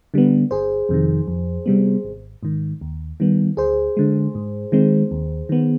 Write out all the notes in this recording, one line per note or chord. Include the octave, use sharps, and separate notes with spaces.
D3 G3 B3
G1 G#4 C5
F2 C3 D#3
F2
C3 G3 B3
G#1
G#2 D#3
D#2
D#3 G3 B3
D2 G#4 C5
D3 G#3
G#2
D#3 G#3 C4
D#2
D#3 B3